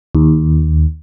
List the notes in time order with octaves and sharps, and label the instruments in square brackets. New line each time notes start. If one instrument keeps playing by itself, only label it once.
[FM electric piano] D#2